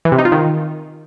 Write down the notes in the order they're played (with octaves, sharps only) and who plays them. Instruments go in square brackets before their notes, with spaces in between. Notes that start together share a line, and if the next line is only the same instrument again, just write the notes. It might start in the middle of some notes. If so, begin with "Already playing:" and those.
[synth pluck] E3
C3
D#4
F4
D#3